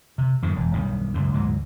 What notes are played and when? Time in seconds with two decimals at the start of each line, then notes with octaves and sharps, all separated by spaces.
0.18 C3
0.42 F#2 A2 D3 D#3
0.56 E1
0.74 B1 G2 D#3
1.14 C#2 F#2 A#2
1.33 D2 G#2 B2 F#3